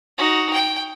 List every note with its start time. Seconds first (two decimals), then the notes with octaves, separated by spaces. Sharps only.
0.18 D#4 F#4
0.54 G5